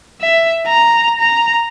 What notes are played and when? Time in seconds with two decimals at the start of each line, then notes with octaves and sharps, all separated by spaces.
0.21 E5
0.67 A#5
1.20 A#5